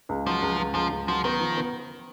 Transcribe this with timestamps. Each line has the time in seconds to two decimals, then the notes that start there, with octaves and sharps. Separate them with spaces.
0.09 C#2
0.27 F3 F#3
0.42 C#2
0.58 C#2
0.75 C#2 F3
0.91 C#2
1.08 F3 F#3
1.24 D#3 B3
1.41 F3
1.57 B3